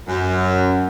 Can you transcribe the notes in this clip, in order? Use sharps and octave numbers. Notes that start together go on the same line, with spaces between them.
F#2